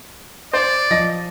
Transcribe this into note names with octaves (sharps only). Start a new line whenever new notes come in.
C5 D5
F3 D#5 A#6